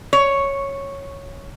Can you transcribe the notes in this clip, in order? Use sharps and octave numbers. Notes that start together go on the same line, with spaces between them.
C#5